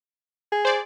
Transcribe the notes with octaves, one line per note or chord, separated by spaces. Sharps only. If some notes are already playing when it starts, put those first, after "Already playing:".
G#4
C5 D5